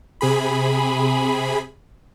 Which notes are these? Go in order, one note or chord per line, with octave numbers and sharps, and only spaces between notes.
C3 G#4 B5